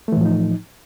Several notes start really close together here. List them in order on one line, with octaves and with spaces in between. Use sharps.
A3 E3 A2 F3 D#4